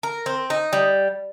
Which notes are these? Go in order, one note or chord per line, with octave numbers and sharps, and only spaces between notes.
A#4
C4
D#4
G3